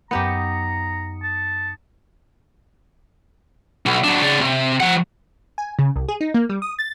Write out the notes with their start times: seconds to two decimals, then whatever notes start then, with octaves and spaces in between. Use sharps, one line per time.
0.11 F#2 B3 D#4 G4 A#5 D#6 C#7
1.23 A5
3.86 B1
4.04 F#3 D4
4.22 C#3 D5
4.41 C3
4.80 F3 F#5
5.58 G#5
5.79 C#3
5.96 C2
6.09 G#4
6.21 D#4
6.34 A#3
6.50 G3
6.62 D#6
6.79 A6